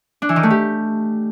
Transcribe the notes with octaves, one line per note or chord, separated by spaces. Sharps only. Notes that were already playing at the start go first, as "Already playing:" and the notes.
D4
E3
D#3
A3
G4